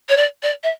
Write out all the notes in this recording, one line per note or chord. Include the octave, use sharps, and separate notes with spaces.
C#5
D5
D5
E5